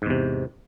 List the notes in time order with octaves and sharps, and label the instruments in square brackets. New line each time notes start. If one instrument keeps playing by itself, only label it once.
[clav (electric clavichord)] G#2
E2
C3